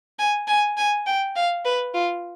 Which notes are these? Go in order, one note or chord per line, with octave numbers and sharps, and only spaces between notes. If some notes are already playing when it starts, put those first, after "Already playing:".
G#5
G#5
G#5
G5
F5
B4
F4